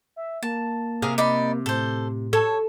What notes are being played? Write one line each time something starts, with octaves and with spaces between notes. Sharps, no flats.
E5
A#3 A5
C3 G#4 A#4 F5
D#4 D5 B5
A2 A4 C5
A4 C#5